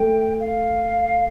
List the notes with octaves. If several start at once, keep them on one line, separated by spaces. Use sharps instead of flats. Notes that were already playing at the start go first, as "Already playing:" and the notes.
Already playing: A3 G5
F5